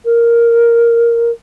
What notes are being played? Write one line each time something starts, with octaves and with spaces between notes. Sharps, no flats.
A#4